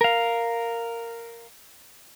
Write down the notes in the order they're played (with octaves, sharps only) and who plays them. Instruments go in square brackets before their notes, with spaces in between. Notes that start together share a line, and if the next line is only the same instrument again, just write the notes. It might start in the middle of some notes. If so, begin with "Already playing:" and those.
[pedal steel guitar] A#4 F5